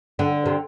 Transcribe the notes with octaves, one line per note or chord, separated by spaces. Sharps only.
D3
C3